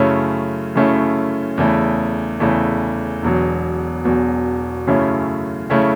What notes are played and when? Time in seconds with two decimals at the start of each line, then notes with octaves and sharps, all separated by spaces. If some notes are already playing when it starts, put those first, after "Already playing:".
Already playing: F#2 C#3 A3 C#4 E4
0.75 F#2 C#3 A3 C#4 E4
1.58 E2 C#3 A3 E4
2.40 E2 C#3 A3 E4
3.22 E1 E2 B2 F#3
4.05 E1 E2 B2 F#3
4.87 F#2 C#3 A3 C#4 E4
5.70 C#3 A3 C#4 E4